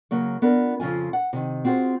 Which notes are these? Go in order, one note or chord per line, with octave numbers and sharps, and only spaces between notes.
C#3 F#3 A#3 C#5
B3 D4 F4 A#4
F2 C#3 F3 F4 G#5
F#5
C3 D#3
C4 F4 F#4 G#4 C5